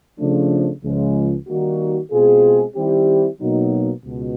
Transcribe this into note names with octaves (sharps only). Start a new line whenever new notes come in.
C#3 F3 A3 D4
C#2 C#3 F3 G#3
D#3 G3 A#3 D#4 F#4
B2 G#3 C4 F4 G#4
D#3 G3 C4 E4 G4
B2 F#3 A#3 D#4
C#2 B2